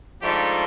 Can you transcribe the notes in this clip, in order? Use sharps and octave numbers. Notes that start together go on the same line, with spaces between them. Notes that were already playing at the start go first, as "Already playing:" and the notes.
G#2 F3 A3 D4 G4